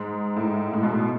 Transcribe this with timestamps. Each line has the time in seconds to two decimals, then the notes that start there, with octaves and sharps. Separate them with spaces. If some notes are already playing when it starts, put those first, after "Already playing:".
Already playing: G#2
0.36 A2
0.43 G#2
0.73 A2
0.83 B2
0.92 A2